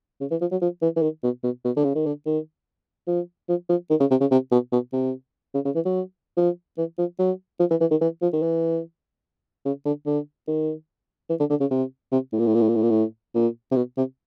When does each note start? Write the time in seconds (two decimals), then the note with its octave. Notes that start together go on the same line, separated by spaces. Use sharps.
0.21 C#3
0.31 E3
0.41 F3
0.51 F#3
0.62 F3
0.82 E3
0.96 E3
1.02 D#3
1.23 B2
1.44 B2
1.64 B2
1.77 D3
1.84 C#3
1.95 D#3
2.06 D3
2.26 D#3
3.08 F3
3.49 F3
3.69 F3
3.90 D#3
4.00 C#3
4.11 C3
4.21 C#3
4.31 C3
4.52 B2
4.72 B2
4.93 C3
5.55 C#3
5.65 C#3
5.75 E3
5.86 F#3
6.37 F3
6.78 E3
6.98 F3
7.19 F#3
7.60 F3
7.71 E3
7.81 E3
7.91 D#3
8.01 E3
8.22 F3
8.33 D#3
8.42 E3
9.65 C#3
9.86 D3
10.06 D3
10.47 D#3
11.30 E3
11.40 D3
11.50 D3
11.60 C#3
11.71 C3
12.12 C3
12.33 A2
12.39 A#2
12.47 A2
12.55 A#2
12.61 A2
12.69 A#2
12.76 A2
12.83 A#2
12.90 A2
13.35 A#2
13.72 C3
13.76 B2
13.97 C3